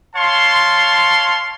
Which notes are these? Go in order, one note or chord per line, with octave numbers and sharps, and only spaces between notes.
C#5 F5 A5 C6